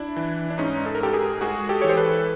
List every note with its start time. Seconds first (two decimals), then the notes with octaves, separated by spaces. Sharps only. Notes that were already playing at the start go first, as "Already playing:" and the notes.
Already playing: D4 E4
0.16 E3
0.50 D4
0.58 G#2 C#4 D#4
0.86 A4
0.95 A#4
1.00 G#2 G4 A4
1.14 G#4 A#4
1.41 G#3 F#4 G#4
1.69 G4 A4
1.82 E3 C#5
1.89 C5
1.97 A4 B4